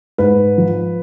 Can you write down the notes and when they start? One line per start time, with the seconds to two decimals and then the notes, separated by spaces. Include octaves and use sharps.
0.18 G#2 B4
0.58 F3